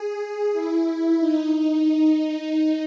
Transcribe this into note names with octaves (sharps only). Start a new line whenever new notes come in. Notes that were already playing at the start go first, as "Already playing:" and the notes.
Already playing: G#4
E4
D#4
D#4